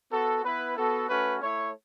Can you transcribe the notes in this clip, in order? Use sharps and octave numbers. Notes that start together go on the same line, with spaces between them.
B3 F#4 A4
B3 E4 B4
B3 F#4 A4
A3 C#4 F#4 B4
A3 E4 C#5